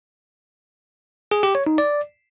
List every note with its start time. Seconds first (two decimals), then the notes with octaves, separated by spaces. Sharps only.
1.31 G#4
1.43 G4
1.55 C#5
1.67 D#4
1.78 D5